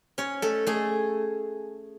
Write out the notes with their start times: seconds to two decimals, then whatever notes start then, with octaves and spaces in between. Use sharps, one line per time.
0.18 C#4 C#5
0.42 A3 A4
0.67 A3 G#4